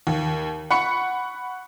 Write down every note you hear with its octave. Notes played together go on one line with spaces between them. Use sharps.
D#2
F#5 B5 C#6 C#7